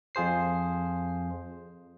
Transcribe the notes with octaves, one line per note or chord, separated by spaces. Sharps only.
F2 F4 G#4 C5 C7